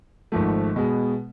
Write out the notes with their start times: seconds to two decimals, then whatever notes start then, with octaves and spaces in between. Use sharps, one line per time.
0.32 G#1 G#2 F3 A3
0.76 B2 G#3 B3